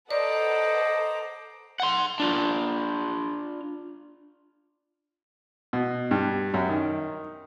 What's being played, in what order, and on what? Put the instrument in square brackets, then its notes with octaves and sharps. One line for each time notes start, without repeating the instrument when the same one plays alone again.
[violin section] A4 B4 F#5 [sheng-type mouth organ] C5 A#5 D6 [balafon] D5 [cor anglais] D#5
[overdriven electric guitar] F#5 C6
D4 F4
[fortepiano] B2
G2
F#2
D#3